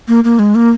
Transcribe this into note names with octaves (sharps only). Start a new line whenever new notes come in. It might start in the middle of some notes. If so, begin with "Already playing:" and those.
A#3
A#3
G#3
A#3